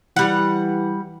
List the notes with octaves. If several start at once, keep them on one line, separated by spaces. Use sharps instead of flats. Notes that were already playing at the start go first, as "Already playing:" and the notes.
E3 G3 F#5